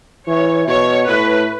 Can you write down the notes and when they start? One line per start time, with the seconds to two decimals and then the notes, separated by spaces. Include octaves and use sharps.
0.28 E3 C#5
0.68 B2 C#5
1.08 A2 B4